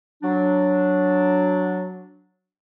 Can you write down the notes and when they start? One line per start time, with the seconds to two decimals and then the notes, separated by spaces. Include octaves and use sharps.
0.23 F#3 D4